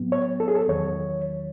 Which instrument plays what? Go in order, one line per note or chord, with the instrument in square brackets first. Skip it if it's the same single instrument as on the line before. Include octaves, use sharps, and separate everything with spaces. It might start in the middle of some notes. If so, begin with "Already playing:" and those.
Already playing: [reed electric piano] A2 F#3 B3
C#5
A4
G#4
A4
E2 D#3 F#3 C#5